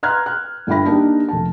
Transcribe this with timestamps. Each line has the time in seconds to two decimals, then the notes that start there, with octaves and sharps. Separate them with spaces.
0.03 B4 A#5 C6 F6 F#6 G#6
0.26 F#6
0.67 G1 D4 E4 G5 B5 A#6
0.85 A#3 D4 D#4 G4 A#4
1.28 F1 A5